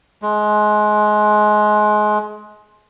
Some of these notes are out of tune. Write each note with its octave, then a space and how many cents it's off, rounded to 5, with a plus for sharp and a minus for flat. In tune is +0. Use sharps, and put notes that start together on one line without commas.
G#3 +25